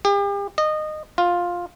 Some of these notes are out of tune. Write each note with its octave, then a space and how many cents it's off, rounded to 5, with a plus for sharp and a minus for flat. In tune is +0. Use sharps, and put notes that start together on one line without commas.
G4 +40
D#5 -20
F4 +10